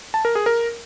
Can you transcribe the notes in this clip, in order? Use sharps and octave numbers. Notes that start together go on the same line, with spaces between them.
A5
A#4
G#4
A#4